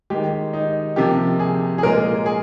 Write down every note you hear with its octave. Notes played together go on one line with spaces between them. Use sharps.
D#3 G#3 G4
D#4
C3 F3 A#3 G4
G#4
G#4
A#2 G#3 A#4
G#4